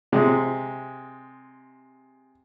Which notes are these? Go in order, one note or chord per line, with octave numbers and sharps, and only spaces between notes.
C3 G#3